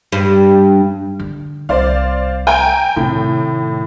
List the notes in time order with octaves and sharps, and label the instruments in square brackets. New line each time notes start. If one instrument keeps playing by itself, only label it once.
[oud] G2
[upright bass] D3
[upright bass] C2 [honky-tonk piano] C5 D5 F5
[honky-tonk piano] G5 G#5 A#5
[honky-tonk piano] A2 [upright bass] C3 D#3